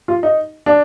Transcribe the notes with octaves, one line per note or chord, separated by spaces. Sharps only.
F4
D#4
D4